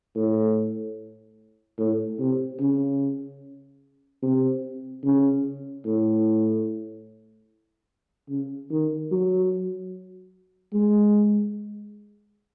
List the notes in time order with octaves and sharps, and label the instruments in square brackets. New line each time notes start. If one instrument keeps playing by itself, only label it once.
[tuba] A2
A2
C3
C#3
C3
C#3
A2
C#3
D#3
F#3
G#3